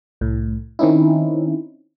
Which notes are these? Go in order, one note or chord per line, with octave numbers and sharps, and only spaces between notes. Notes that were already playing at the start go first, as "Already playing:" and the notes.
C2 A2
D#3 C4 C#4 D#4 E4